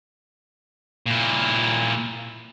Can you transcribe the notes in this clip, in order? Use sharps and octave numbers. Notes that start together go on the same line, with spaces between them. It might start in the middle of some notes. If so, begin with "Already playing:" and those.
A#2 E4